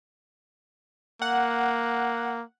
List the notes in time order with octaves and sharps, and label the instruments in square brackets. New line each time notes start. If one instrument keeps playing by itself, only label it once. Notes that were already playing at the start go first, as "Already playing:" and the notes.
[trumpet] A#3 [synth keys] F#5